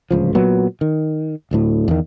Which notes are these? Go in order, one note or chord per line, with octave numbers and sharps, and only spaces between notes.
D1 C#2 F3
A#2 F#3 B3
D#3
D1 D2 A2
E2 D#3